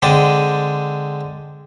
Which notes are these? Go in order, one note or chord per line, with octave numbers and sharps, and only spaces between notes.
D3 G#3 C4 D5